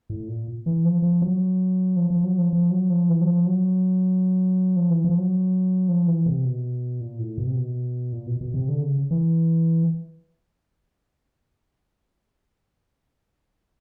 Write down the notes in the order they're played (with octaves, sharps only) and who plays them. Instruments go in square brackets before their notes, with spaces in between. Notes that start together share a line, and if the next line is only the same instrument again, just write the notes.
[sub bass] A2
A#2
E3
F3
F3
F#3
F3
F3
F#3
F3
F3
F#3
F3
E3
F#3
F3
F#3
F3
E3
F3
F#3
F3
E3
C3
B2
A#2
A2
B2
C3
B2
A#2
B2
B2
C3
D3
C#3
E3